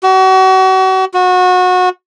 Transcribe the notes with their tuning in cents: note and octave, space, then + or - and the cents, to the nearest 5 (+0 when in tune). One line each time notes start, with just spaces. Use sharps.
F#4 +35
F#4 -25